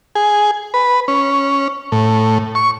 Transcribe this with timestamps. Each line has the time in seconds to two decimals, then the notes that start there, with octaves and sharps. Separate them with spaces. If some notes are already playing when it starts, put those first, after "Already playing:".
0.15 G#4
0.74 B4
1.08 C#4
1.92 A2
2.55 C#6